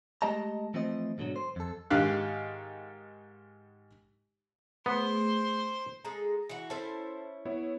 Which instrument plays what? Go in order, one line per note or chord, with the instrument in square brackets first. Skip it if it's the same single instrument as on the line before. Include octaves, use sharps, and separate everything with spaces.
[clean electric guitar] G#3 A3 G4 D#5 A5 A#5
E3 F3 A3 C4 C5 D#5
G#2 B2 D3 D#3 F#3
C5
F2 A4
[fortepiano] G#2 D#3 G4 F5 F#6
[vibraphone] A3 G#4 [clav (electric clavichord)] B3 [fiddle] C5
[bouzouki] G#3 G#4 A4 [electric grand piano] A#5
[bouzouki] E3 F#4
[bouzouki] C#4 E4 [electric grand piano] A4 C5 A5
[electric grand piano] B3 E4 C#5